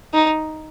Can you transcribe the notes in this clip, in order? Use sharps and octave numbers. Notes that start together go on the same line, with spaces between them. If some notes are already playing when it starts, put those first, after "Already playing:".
D#4